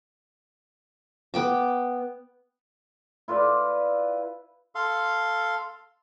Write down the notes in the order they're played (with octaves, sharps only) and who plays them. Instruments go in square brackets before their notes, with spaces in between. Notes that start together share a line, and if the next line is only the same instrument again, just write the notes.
[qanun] B3 G5 D6
[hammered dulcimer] E4 F4 B4 D5
[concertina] A4 F5 C6